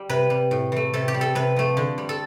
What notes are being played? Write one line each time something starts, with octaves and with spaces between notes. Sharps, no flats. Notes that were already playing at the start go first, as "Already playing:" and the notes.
Already playing: G3
C3 B4
G3
A2
E3 A3
C3 A4
G4
G3
A4
C3 B4
F3 A3
D3
G3
A4